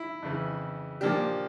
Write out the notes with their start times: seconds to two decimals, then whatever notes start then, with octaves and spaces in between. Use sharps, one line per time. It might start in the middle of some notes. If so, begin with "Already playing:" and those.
Already playing: E4
0.22 F2 C#3 E3
1.01 A#2 F3 A#3 D4 G4